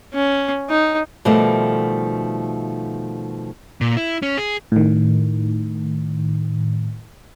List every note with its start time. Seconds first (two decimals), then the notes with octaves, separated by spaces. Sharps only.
0.14 C#4
0.69 D#4
1.25 B2 D#3 F3 G3 A3
3.81 A#2
3.97 E4
4.22 C#4
4.38 G#4
4.72 A2 D#3